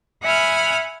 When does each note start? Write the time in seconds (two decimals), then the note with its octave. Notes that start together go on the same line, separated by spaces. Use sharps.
0.22 E5 F#5 G#5 B5 F6